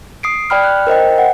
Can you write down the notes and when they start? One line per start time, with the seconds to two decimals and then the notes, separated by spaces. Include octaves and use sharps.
0.23 D#6 C7 D7
0.50 D5 G5 B5 F6
0.64 F#6
0.87 A#4 C5 D#5 G5
1.18 F#5